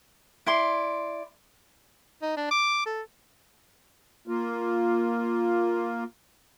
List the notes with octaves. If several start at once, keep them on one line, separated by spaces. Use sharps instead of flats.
E4 D5 C6
D#4
D4
D6
A4
A#3 F4